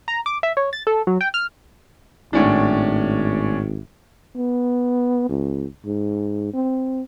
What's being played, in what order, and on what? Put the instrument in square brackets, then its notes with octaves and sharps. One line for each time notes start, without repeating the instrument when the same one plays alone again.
[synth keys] A#5
D6
E5
C#5
A6
A4
F#3
G5
F6
[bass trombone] G#1 [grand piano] A2 C#4 D4
[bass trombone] B3
C#2
G#2
C4